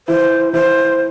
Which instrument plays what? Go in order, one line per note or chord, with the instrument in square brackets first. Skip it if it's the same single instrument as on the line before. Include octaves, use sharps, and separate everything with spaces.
[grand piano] E3 E4 [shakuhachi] C5
[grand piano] E3 E4 [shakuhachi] C5